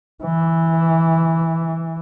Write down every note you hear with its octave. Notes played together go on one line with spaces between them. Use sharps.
E3